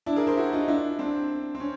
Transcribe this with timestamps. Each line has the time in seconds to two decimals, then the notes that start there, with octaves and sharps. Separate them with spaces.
0.06 D4 E4
0.16 G#4 A#4
0.27 A#4 C5
0.37 E4 F#4
0.53 D#4 F4
0.68 D4 E4
0.99 C4 D4
1.55 C4
1.60 C#4